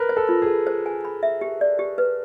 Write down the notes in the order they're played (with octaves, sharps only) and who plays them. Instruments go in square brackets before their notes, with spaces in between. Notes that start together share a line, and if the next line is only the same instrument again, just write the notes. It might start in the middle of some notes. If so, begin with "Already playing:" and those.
Already playing: [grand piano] A#4 B4
[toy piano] C5
[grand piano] A4
[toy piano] F4
[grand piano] G#4
[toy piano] A4
C5
G#5
B5
E5
G4
D5
G4
B4